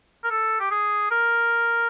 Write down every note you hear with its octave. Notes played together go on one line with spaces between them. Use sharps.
A#4
A4
G4
G#4
A#4